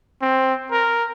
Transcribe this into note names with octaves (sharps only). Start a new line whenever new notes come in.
C4
A#4